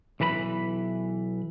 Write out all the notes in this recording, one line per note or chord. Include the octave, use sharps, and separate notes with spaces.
B1 E3 B4 D#5 B5